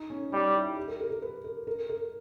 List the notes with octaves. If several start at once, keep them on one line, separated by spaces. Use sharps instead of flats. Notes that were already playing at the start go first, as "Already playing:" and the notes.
Already playing: D#4
C#4
G3 D#4
E4
G4
A#4
A#4
A#4
B4
A#4
A#4
A#4